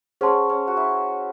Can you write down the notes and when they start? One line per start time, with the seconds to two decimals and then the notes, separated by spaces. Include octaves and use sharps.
0.21 C#4 G#4 C5 F#5 A5 C6
0.50 C#4
0.67 F#4
0.77 E4